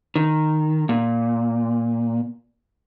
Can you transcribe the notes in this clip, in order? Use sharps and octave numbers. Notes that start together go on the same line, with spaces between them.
D#3
A#2